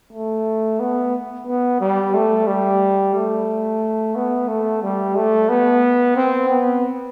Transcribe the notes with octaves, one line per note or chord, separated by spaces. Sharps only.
A3
B3
B3
G3
A3
G3
A3
B3
A3
G3
A3
B3
C4
B3